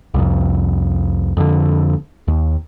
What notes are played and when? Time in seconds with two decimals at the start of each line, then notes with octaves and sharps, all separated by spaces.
0.14 C2 F2
1.37 F2 D3
2.28 D#2